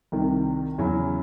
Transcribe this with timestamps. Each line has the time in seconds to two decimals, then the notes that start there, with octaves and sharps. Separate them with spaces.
0.12 C2 C3 D#3
0.78 E2 C#3 F#3 C#4 E4